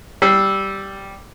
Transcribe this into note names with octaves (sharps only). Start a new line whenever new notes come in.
G3 E6 C7